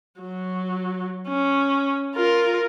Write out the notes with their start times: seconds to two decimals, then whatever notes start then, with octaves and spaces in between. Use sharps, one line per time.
0.20 F#3
1.28 C#4
2.14 F4 A#4